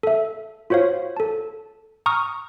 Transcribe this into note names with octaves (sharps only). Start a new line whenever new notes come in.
A4 E5
F4 F#4 C5 C#5 F5
A4 A5
A#5 C#6 D#6 F6